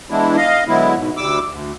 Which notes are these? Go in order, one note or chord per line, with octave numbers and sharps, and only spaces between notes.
E3 G#3 B3 D4 E4
D#5 F5
D3 F#3 G#3 B3 E4
G#2 B2
D2 G3 D6 E6
D2